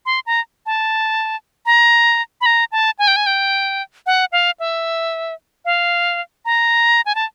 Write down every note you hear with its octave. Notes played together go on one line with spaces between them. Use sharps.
C6
A#5
A5
A#5
B5
A#5
A5
G#5
G5
G#5
G5
F#5
F5
E5
F5
A#5
G#5
A5